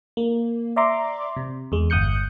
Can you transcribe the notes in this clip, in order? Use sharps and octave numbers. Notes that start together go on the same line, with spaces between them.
A#3
D5 E5 A#5 C6 D6
C3
E2 G#3
G1 D#6 F#6 G6 C#7